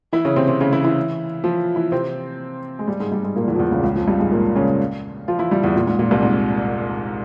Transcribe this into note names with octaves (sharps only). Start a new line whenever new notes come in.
E3 E4
C#3 C#4
C3 C4
C3 C4
C#3 C#4
E3 E4
E3 E4
F3 F4
E3 E4
C3 C4
G#3
G2 G3
G#2 G#3
G2 G3
G#2 G#3
A#2 A#3
E2 E3
F3
E2 E3
C#2 C#3
C#2 C#3
F2 F3
G2 G3
G#2 G#3
A#2 A#3
C#3 C#4
F3 F4
E3 E4
G2 G3
E2 E3
A#2
G#2
A#2
C2 C3
G#2